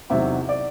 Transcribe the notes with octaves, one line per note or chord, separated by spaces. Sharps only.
E2 C3 D#3 F#3 E5
D5